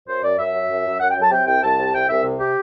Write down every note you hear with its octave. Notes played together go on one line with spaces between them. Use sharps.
F#2 C5
F#2 D5
F#2 E5
F#3
F#2
F#2
F#2 F#5
G5
F#3
A5
C3 G5
C2 G5
C2 A5
C3
C2 G5
C2 E5
C3
G4